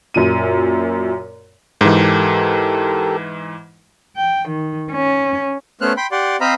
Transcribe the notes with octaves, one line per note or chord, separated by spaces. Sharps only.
F#2 A#2 D#7
G#2 E3 G4 A4 A#4
G5
D#3
C#4
A3 B3 C#4 C5 F6 F#6
G5 B5 C6
G4 D5 F#5 C6
C4 C5 D#5 F5 A#5 B5